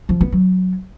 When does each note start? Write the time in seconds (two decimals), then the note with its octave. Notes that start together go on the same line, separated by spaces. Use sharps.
0.09 F3
0.21 B3
0.32 F#3